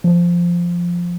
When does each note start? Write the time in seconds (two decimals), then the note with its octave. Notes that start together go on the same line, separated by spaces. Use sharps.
0.04 F3